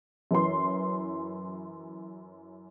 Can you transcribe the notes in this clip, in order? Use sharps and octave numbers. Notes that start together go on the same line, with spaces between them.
F#2 E3 C6